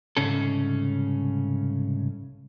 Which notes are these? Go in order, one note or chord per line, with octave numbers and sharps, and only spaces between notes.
C2 G#2 C#3 C#4 A4